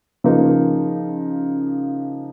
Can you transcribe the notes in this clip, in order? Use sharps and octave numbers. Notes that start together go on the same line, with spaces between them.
C#3 F3 A#3 D#4